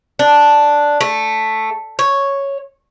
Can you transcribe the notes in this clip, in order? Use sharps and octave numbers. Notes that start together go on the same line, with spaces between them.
D4
A3
C#5